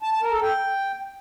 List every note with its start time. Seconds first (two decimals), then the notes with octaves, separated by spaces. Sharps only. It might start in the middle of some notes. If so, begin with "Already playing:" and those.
0.02 A5
0.12 A5
0.22 A#4
0.33 A4
0.43 G5